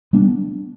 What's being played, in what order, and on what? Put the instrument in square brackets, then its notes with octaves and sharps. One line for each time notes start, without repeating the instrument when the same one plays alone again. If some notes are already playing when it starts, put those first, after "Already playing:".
[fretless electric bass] G3 B3 D4